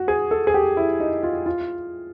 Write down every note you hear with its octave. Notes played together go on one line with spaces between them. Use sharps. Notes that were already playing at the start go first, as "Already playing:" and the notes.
Already playing: F#4
G#4
A4
G#4
G4
E4
D#4
F4
F4